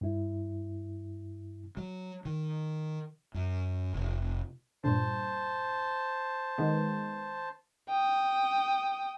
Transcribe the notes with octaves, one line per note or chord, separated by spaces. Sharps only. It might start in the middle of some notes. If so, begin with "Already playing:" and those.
G2 E4
F#3
D#3
F#2
F1
G2 A#2 D3 C5 A5
D#3 G#3 B3
G5 D#6